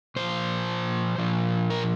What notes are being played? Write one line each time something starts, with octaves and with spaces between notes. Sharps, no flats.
A#2 F3 C5
A#2 F3
A#4